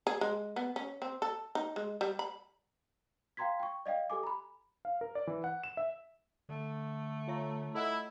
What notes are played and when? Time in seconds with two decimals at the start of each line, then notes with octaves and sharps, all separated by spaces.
0.07 G#4
0.21 G#3
0.56 B3
0.76 C#4
1.02 C4
1.22 A4
1.55 D#4
1.76 G#3
2.01 G3
2.19 B5
3.37 F5 G5 A#5 C6 G#6 B6
3.60 G5 C#6
3.86 D5 D#5 F5 G5
4.10 G4 A4 G#5 D6
4.23 A#5 B5
4.85 F5
5.01 A#4
5.15 D5
5.27 E3
5.44 F#5
5.63 E7
5.77 E5
6.49 D3 A3
7.28 F4 C#5 A#5
7.75 E4 A4 D#5 F#5